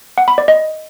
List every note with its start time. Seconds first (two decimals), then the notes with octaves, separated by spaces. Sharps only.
0.18 F#5
0.28 B5
0.38 D5
0.48 D#5